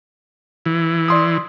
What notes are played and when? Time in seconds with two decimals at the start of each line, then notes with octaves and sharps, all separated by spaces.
0.66 E3
1.08 D5 C6 D#6